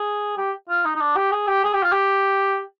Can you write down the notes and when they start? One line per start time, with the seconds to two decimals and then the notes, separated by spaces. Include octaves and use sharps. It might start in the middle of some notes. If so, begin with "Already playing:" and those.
Already playing: G#4
0.37 G4
0.69 F4
0.85 D#4
0.96 D#4
1.00 D4
1.16 G4
1.31 G#4
1.47 G4
1.64 G#4
1.73 G4
1.83 F4
1.92 G4